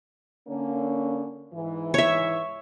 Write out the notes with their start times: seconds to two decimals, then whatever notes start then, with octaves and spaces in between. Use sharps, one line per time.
0.48 D3 A#3 C#4
1.53 G#2 E3
1.94 C#5 E5